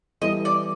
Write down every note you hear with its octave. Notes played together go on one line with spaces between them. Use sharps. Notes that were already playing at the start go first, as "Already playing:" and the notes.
E3 G3 B3 E4 A4 D#5
D5